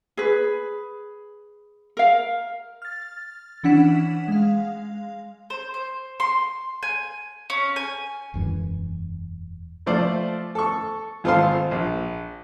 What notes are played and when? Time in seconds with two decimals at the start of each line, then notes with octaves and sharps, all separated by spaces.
0.17 G#4 B4
1.97 A#4 F5
2.82 F6 A6
3.64 E3 C#4 D4 F#5 B6 E7
4.28 G#3 F5
5.50 C5
5.74 C5
6.20 C6
6.83 G#5
7.50 C#4
7.76 G#5
8.34 E1 F#2 E3
9.86 F3 A3 C5 D5
10.55 A4 C#6
11.24 G#1 F4 A4 C5 F5 C6
11.71 A#1